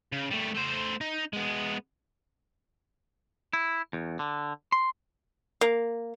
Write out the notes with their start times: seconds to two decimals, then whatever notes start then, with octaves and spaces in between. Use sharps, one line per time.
0.12 C#3
0.31 G3 A3
0.54 A3 C5
1.01 D#4
1.33 G#3 B3
3.53 E4
3.93 E2
4.19 D3
4.72 C6
5.61 A#3